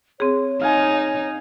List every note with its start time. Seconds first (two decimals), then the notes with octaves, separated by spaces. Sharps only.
0.20 C4 G#4 C#5
0.61 D#4 F5 G#5